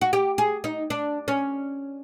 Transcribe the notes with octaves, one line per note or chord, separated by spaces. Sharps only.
F#4
G4
G#4
D#4
D4
C#4